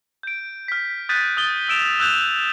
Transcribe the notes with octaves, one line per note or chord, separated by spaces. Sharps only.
G6 D7
F6 B6
D#6 F#6 G6 A6 B6 D#7
D#6 A6 G7
E6 D7 E7 F7
E6 F#6 G6 F7